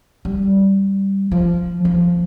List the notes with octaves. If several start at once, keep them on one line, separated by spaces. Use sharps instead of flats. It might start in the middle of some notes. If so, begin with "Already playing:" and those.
G3
F3
F3